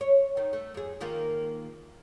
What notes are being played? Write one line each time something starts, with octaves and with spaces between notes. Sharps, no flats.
C#5
D#3
A3
F2 G#4
D#3 A#3 F4